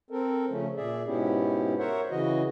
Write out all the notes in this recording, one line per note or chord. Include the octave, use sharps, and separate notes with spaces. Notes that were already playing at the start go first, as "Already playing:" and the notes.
C4 A4 A#4
C#3 F3 A3 C#4
A#2 G#4 D5 E5
G#2 B2 B3 C#4 E4 G4
A#4 C5 C#5 E5 F#5
C#3 E3 F#4 D#5